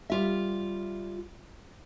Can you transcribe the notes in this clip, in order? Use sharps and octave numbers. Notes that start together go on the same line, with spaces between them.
G3 F4 E5